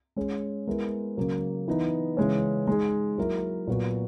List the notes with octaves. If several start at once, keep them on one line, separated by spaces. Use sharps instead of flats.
G#3 C#4 G#4
G#3 B3 E4 A#4
C#3 F#3 A#3
E3 B3 D#4
C#3 E3 G#3 C#4
G#3 D#4 G#4
F#3 A#3 E4 A#4
A#2 F#3 B3 F#4